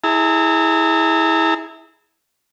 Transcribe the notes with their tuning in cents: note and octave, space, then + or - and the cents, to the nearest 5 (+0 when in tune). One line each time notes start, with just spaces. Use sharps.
E4 -20 G#4 +0 A#5 -45